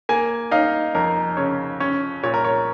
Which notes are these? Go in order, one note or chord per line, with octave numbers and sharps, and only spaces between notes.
A#3 G#5
D#4 F5
F2 A#4
C#3 C#5
C#4 C#5
A#2 C#5
A#4
C#5